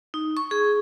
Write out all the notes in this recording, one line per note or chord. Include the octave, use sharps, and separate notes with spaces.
D#4
C#6
G#4